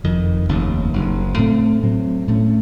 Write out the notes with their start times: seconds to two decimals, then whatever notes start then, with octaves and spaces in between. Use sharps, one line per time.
0.04 F#1 F2 D#3
0.48 F1 D#2 C#3
0.93 F#1 F#2 C#3
1.38 A2 A3 C4
1.83 A2 F#3 C4
2.27 A2 A3 C#4